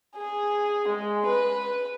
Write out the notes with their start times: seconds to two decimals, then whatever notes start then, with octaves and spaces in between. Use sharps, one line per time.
0.16 G#4
0.88 G#3
1.26 B4